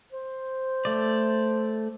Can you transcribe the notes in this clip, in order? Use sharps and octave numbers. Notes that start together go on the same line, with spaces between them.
C5
A3 D5